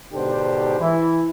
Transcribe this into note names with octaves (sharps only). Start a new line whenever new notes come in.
G#2 B2 D3 D4 G4 C5
E3 E4